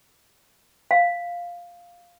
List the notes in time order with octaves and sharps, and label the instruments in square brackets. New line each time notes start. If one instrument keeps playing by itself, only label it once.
[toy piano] F5